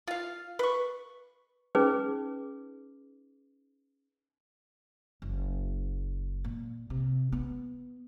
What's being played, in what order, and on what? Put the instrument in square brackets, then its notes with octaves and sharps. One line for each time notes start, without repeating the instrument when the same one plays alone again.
[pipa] F4 F5
B4 C#6
[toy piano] C#4 D#4 G#4 B4 D6
[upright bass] F#1
A#2
C3
B3